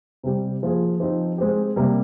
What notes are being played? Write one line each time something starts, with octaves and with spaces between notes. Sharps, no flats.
C3 G3 C4 G4
F3 A#3 F4 G#4
F3 C4 D#4 G4
G#3 C4 G4
C3 G3 A#3